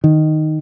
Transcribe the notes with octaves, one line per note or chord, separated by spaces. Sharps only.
D#3